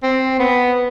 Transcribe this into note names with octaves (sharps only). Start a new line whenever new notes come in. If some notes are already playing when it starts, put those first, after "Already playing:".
C4
B3